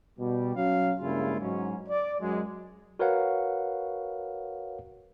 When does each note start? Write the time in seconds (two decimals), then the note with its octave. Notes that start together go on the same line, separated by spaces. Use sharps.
0.19 B2 G3
0.56 F#3 C#4 F5
1.01 G2 C#3 G#3 A#3 E4 F4
1.41 G#2 F#3 C#4
1.89 D5
2.21 F#2 G#3
2.99 F#4 A#4 B4 C#5 F5 F#5